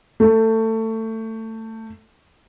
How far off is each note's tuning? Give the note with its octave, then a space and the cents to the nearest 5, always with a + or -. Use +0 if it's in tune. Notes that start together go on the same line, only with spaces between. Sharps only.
A3 +20